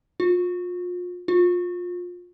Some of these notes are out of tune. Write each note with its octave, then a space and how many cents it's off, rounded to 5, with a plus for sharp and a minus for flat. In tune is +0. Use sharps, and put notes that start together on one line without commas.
F4 +35
F4 +25